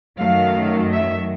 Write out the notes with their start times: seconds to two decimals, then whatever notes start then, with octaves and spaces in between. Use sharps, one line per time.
0.18 F#2 D#3 F#3 A3 F5
0.90 E5